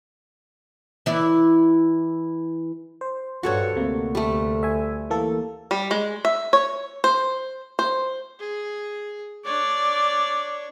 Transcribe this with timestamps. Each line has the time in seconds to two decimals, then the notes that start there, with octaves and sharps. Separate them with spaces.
1.06 E3 E4 D5
3.01 C5
3.43 G2 F#4 A4 C#5
3.76 D2 C3 A#3
4.15 G3 A3
4.63 E5 G#5
5.10 E3 A#3 A4
5.71 G3
5.91 G#3
6.25 E5
6.53 C#5
7.04 C5
7.79 C5
8.39 G#4
9.45 D4 C#5 D5